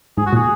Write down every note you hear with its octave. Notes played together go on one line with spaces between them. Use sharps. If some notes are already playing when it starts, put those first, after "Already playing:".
G#2 G#4
F#4
A#2 G#4